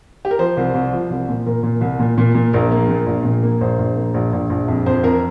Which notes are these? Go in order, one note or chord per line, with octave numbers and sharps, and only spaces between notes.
G4
A#4
F3 C5
C2
C2
F3
C2
A#2
A#2 A#4
A#2
C2
A#2
A#2
A#2
A#1 A#4
A#3
A#2
A#1
A#2
A#3
A#1 C5
A#1
A#3
A#1
A#1
A#1
F2
F2 C5
F2 A#4